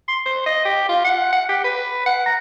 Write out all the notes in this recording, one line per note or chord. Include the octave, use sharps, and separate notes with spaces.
C6
C5
D#5
G4
F4
F#5
F#5
G4
B4
F#5
A#5